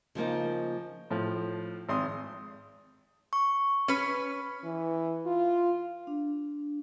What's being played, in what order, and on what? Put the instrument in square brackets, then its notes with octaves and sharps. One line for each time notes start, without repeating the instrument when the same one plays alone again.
[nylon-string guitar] C#3 F3 A#3 D#4
[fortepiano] A2 F3
G#1 C6 D#6
[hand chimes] C#6
[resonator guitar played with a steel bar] C#4 B4
[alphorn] E3
F4
[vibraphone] D4